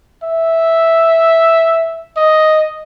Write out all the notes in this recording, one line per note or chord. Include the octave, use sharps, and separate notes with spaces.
E5
D#5